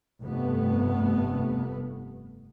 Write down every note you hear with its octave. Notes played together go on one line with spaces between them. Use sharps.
F1 G2 A3 B3